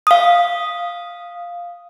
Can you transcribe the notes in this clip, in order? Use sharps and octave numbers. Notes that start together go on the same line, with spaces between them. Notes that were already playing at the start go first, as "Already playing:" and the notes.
F5 D#6